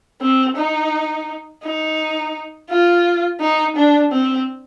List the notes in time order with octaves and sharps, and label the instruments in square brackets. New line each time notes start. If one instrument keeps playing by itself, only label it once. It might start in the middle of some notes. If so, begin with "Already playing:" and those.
[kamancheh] C4
D#4
D#4
F4
D#4
D4
C4